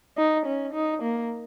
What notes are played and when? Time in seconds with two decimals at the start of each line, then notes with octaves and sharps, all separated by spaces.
0.17 D#4
0.46 C#4
0.73 D#4
1.02 A#3